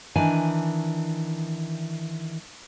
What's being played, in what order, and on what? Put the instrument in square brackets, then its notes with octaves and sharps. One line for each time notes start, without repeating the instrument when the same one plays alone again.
[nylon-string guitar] D#3 E3 D4 G#5